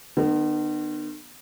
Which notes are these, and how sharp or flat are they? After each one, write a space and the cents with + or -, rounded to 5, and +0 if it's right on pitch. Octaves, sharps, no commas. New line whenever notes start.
D#3 -45 B3 +0